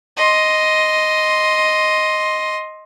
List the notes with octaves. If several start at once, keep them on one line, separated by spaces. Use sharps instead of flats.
D#5 C6